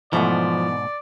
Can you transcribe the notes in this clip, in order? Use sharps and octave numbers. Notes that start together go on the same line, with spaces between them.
G#2 B2 E3 F3 A3 B3 D5